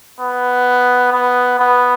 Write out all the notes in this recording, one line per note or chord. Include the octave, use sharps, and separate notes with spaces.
B3
B3
B3